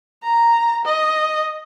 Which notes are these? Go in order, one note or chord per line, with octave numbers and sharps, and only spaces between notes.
A#5
D#5